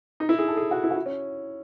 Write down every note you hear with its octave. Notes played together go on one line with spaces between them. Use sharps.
D#4
E4
G#4
A4
G#4
F#4
E4
F#4
E4
C#4